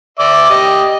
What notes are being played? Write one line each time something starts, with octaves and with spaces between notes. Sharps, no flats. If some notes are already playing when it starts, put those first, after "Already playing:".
D5 E5 D6
G4 D#5